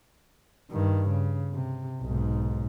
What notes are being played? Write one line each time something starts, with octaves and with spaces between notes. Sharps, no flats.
G2 D#3
C#3
C3
B1 G#2